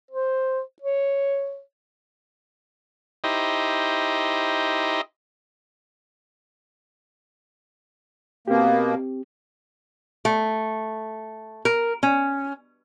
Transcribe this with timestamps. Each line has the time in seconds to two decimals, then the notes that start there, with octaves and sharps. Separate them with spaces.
0.11 C5
0.82 C#5
3.24 D#4 E4 G4 C5 D#5
8.48 B2 A#3 C4 G4
10.25 A3
11.65 A#4
12.03 C#4